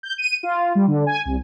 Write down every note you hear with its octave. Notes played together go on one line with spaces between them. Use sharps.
G6
D#7
F4
G3
D3
G#5
C2